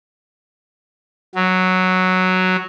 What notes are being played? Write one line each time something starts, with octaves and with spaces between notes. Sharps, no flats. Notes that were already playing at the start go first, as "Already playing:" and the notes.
F#3